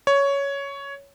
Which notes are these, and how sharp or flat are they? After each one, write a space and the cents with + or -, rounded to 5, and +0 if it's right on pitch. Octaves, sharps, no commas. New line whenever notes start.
C#5 +10